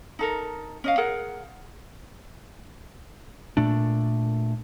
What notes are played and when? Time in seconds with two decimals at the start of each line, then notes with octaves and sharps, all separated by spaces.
0.19 D#4 A4 A#4
0.84 C#4 D#5 F5
0.98 G#4 A#4 F#5
3.57 A#2 A3 D4